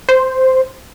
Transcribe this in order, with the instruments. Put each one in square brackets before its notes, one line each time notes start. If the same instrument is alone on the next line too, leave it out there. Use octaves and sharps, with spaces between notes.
[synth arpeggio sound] C5